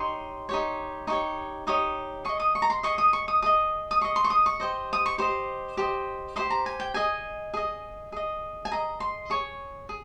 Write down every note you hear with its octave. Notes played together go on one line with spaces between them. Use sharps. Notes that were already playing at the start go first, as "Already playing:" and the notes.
Already playing: D#4 G4 C#5 C6
D#4 G4 C#5
D#4 G4 C#5 C#6
D#4 G4 C#5 D#6
G#4 D#5 C#6
D#6
C#6
A#5
C6
G#4 D#5 C#6
D#6
C#6
D#6
G#4 D#5 D#6
D#6
G#4 D#5 C#6
C6
C#6
D#6
C#6
G4 C5 D#5
D#6
C#6
G4 C5 D#5 C6
G4 C5 D#5
G4 C5 D#5 C6
A#5
G#5
G5
G#4 D#5 G#5
G#4 D#5
G#4 D#5
G#5
G#4 D#5 A#5
C6
G#4 C#5 C#6
G#4